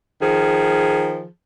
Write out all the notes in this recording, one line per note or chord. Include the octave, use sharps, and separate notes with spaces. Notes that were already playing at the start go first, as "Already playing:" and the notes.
D#3 F3 G#4